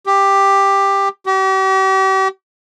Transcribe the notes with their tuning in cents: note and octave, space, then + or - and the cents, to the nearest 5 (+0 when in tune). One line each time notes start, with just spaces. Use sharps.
G4 +10
G4 -40